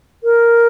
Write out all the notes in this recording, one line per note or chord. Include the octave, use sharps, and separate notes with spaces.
A#4